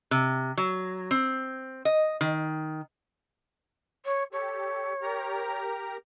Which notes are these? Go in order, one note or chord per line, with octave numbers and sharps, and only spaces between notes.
C3
F#3
C4
D#5
D#3
C#5
G4 A4 C#5
G4 A#4 A#5